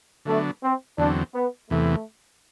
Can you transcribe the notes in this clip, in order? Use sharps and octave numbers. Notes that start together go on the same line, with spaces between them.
D3 F#3 A3 B3 D4
C4
E2 D3 F#3 C4 D4
B3
E2 C3 E3 A3